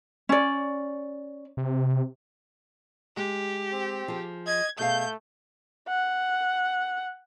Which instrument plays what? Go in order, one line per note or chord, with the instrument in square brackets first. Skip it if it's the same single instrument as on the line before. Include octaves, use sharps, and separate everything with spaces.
[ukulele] C#4 D5
[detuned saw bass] C3
[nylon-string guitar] G#3 [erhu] G4
[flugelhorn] C4
[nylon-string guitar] F3 G#4
[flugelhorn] D#5 [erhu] G#6
[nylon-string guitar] B2 G#4 F5 [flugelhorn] A3 [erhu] G6
[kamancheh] F#5